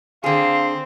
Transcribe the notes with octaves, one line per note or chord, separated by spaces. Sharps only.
D3 C4 G#4 F5